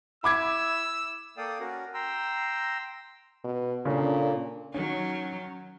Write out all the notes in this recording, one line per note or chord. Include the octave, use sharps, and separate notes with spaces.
E4 B5 D6 E6 G#6
A#3 A4 D5 F5 G5 D#6
C#4 F#4 A#4
G5 A#5 C6 E6
B2
A#2 C#3 C#4 D4 A4
D#3 F#3 C#4